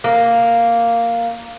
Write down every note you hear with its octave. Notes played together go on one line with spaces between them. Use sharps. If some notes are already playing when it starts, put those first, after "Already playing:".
A#3